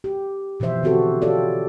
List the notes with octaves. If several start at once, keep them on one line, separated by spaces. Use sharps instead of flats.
G4
B2 E3 F3 C5 E5
D3 F3 C4 F#4 G4 A4
F4 G4 A4 C#5 D5